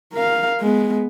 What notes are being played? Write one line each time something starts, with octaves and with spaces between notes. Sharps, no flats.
A#4 F5
G#3 B3